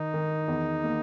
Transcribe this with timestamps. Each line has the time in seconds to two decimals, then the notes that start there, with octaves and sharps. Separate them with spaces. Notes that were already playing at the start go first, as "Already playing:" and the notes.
Already playing: D#3 D#4
0.14 D#3
0.48 E2
0.84 A#3